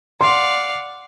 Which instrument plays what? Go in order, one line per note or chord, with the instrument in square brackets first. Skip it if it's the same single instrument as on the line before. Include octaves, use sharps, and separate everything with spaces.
[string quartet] D5 F5 F#5 [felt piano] C6